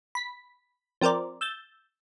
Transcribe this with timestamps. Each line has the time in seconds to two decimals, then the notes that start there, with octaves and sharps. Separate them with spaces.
0.15 B5 B6
1.01 F3 C4 A#4 C5 D5
1.41 E6 G6 A6